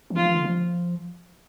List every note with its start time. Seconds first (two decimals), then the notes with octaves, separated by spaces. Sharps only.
0.10 E3
0.16 F3 F4
0.25 E3
0.35 D3
0.45 F3